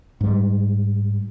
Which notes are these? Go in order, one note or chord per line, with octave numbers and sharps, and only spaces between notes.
G#2 G3